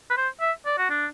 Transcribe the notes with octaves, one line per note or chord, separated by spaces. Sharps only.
B4
C5
E5
D5
F#4
D4